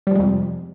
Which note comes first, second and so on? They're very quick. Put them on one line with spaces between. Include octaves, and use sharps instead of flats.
G3 F3 G#3 F2 C3